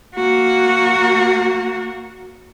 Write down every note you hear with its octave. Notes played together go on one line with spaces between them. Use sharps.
A#3 F#4